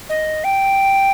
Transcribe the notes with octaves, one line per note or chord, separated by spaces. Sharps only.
D#5
G5